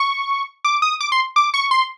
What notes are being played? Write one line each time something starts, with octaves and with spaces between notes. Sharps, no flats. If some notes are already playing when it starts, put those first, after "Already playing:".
Already playing: C#6
D6
D#6
D6
C6
D6
C#6
C6